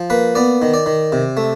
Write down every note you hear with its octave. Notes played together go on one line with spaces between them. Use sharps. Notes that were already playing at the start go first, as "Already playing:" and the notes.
Already playing: F3
A#3 B4
B3 D5
D#3
D5
D#3
C3
A3